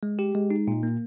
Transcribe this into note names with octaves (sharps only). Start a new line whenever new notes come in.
G#3
G4
G#3
D#4
A#2
A#3